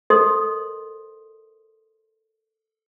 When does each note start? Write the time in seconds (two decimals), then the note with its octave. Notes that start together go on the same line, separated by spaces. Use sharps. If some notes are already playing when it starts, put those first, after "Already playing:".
0.10 A4 A#4 C5 D#5 C6 D#6